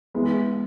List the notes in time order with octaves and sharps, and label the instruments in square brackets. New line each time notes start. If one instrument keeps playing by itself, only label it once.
[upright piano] E3 G#3 B3